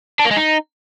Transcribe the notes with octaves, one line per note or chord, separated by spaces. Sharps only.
D4
A#3
G#3
D#4